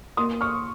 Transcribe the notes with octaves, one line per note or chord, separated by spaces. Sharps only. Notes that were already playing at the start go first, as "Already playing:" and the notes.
A#3 C6 D#6
C#6 F6